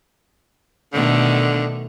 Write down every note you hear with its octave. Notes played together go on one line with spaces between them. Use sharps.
B2 D3 D#3 A3